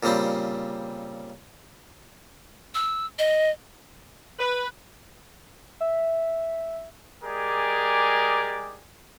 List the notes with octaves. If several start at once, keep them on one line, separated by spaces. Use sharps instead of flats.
A#2 C#3 G3 C4
E6
D#5
B4
E5
G#3 G4 G#4 A#4 D5 G#5